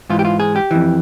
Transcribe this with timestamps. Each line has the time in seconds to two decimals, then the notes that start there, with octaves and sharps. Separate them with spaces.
0.10 G#2 E3 F4
0.19 G4
0.25 F4
0.40 G#4
0.56 G4
0.71 F2 E3